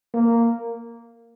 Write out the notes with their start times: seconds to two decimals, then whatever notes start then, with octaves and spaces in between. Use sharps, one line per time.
0.14 A#3